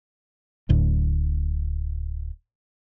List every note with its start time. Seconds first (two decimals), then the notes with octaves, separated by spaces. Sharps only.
0.69 D1 D2 A2